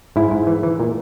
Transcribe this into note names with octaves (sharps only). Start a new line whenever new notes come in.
G#2 E4
G#2
E3
E3
A#2